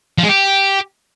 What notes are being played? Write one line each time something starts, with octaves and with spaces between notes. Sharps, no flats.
F3
G#3
G4